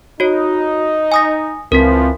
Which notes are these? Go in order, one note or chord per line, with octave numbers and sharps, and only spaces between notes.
D#4 F#4 C#5
G#5 D#6 A#6
C#2 E3 F3 C4 A#4 B6